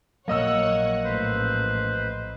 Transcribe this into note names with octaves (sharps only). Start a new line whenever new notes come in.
A#1 F#3 A#3 C#5 D#5 F#5 E6
A1 B4 C5